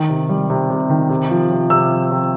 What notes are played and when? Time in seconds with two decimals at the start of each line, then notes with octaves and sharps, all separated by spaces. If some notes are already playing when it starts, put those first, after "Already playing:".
Already playing: D#3
0.09 C3
0.29 G3
0.50 C3
0.70 C3
0.89 D#3
1.09 C3
1.30 F3
1.50 C3
1.70 C3 E6
1.91 F3
2.11 C3